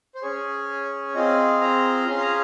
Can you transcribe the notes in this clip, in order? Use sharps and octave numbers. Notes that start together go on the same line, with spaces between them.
C5
C#4 G#4 C#5
C4 F4 G#4 D#5
A#5
C#4 F4 G#4 C6
A#5